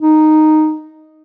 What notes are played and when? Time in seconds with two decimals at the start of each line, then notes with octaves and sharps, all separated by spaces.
0.01 D#4